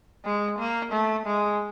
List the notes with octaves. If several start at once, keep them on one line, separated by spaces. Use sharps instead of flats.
G#3
A#3
A3
G#3